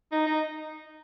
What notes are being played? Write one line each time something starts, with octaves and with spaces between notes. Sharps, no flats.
D#4
D#4